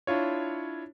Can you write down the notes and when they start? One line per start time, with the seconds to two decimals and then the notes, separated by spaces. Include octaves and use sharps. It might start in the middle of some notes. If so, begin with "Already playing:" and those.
0.07 D4 E4 F4 C#5